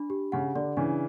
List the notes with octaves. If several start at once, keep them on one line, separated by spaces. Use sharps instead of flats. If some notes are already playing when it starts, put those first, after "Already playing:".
Already playing: D4 B5
G4
C#3 F#5
D3 D5
C#3 E3 D4